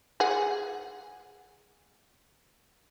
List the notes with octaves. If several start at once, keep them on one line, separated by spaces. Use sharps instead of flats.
G#4 F#5